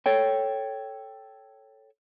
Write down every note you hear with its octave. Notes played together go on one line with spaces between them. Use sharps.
A4 C#5 G5